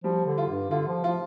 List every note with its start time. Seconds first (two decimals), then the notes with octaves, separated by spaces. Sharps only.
0.04 F3 G3
0.26 D3
0.38 F4
0.49 G2
0.70 D3 F4
0.88 F3
1.04 F3 F4